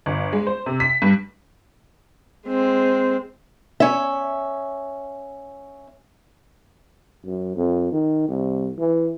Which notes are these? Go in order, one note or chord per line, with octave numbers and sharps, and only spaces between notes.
G1
G#3
C5
C3
B6
G2
G#3 C4
C#4 E5
F#2
F2
D#3
C2
E3